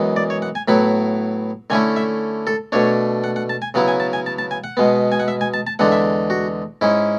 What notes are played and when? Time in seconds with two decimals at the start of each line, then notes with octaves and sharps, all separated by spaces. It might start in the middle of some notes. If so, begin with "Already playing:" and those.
Already playing: F#2 E3 G#3 B3
0.16 D5
0.30 C#5
0.42 F#5
0.55 G#5
0.68 A2 F#3 B3 E4 B5
1.70 D3 A3 C#4 E4 G#5
1.96 E5
2.47 A4
2.72 B2 A3 D4 C#5
3.24 F#5
3.36 F#5
3.49 A5
3.62 G#5
3.74 C#3 F#3 B3 E4 F#5
3.88 G#5
4.00 A5
4.13 G#5
4.26 A5
4.39 A5
4.51 G#5
4.64 F#5
4.77 B2 G#3 B3
5.12 G#5
5.20 F#5
5.28 E5
5.41 G#5
5.54 A5
5.67 A5
5.79 E2 D3 G#3 D4 F#5
5.92 E5
6.30 F#4
6.81 G#2 G#3 C#4 E4